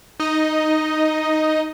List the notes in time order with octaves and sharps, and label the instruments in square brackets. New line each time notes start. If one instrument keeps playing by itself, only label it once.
[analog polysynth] D#4 D#5